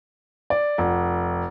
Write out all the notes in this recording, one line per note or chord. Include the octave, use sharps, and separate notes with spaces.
D5
F1